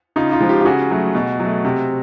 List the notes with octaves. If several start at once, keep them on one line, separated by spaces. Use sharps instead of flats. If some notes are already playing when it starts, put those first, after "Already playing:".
C#3 D#4 F4
D#4 F4
F3 G#3
F4 G4
G4
C#3 F#4 G#4
F#3 A3
B2
F#3 A3
C3